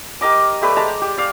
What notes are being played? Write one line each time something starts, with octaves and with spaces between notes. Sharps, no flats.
G4 A#4 D#5 D6
A3 G4 B4 D5
G#3 A5 A#5
G4
D5 F5